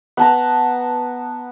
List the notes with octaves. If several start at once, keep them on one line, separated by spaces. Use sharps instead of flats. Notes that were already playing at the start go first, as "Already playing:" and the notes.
B3 A5 A#5